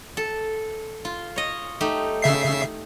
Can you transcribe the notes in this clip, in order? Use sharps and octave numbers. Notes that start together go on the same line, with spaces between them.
A4
F4
C#5 D#5
A3 D#4 G4
C#3 E5 C7